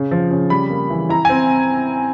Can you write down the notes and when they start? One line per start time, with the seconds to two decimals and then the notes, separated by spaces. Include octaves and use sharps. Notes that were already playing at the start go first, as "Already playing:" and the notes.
Already playing: C#3
0.11 F3
0.31 C#3
0.50 G3 B5
0.70 A#3
0.90 E3
1.09 E4 A#5
1.25 C4 G#5